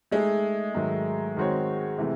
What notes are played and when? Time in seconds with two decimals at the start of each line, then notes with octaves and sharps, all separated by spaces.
0.12 G#3 A3 D#4 G#4
0.75 G#2 D#3 F#3 A3
1.36 D#3 G#3 C4 F#4 C#5
1.98 C3 E3 A3